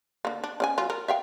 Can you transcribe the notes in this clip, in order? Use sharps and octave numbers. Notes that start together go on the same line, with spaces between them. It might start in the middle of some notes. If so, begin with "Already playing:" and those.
D3 A#3
D4
C#4 D5 G#5
F#3 F4
A#4
E5 F5 G5